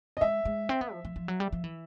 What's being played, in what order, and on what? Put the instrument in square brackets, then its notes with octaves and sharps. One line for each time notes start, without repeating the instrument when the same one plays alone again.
[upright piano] D#5
[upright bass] G#3 [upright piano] E5
[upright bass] G#3
C4
B3
F3
F3
F3
F#3
G3
F3
E3